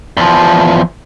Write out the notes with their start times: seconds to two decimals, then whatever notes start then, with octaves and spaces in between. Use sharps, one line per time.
0.17 E2 F3